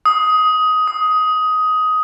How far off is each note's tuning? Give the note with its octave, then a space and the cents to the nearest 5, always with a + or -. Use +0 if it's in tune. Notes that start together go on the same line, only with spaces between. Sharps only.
D#6 +15
D#6 +15